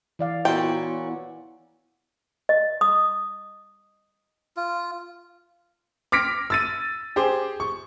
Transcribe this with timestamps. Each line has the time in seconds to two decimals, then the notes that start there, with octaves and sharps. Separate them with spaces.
0.19 E3 D5 F5
0.45 A#2 B3 C#4 E4 F#4 G5
2.49 D#5
2.81 D#6
4.57 F4
6.12 D6 F6 A#6 B6 D7
6.50 E6 A6 D#7
7.16 G4 G#4 C5 D6
7.60 C#6